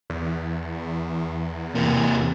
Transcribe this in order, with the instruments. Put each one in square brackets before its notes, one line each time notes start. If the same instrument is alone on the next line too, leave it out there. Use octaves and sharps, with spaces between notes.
[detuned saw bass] E2
[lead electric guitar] C3 A#3